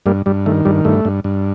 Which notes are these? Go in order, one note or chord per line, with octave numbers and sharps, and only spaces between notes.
G2 G3 A#3
G2 G3
D#3 A3
G2 G3
G2 A3
G2
G2